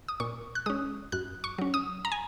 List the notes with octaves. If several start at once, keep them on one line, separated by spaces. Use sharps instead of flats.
D#6
A#2 C#6
F#6
G#3 C#4 D#6
F#2 F#6
C#6
F#3 C#4
D#6
A#5
G#5